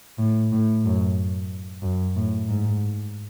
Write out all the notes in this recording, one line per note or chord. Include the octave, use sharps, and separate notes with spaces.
A2
A2
F#2
F#2
A2
G#2